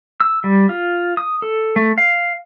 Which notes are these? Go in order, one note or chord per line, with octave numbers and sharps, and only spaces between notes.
E6
G3
F4
D#6
A4
A3
F5